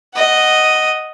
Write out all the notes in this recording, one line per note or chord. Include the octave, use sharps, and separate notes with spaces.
D#5 F#5